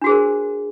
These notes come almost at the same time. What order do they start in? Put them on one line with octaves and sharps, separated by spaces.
D4 F#4 G#4 C5 A#4